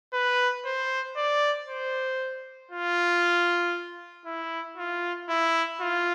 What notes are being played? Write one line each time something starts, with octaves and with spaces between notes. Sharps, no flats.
B4
C5
D5
C5
F4
E4
F4
E4
F4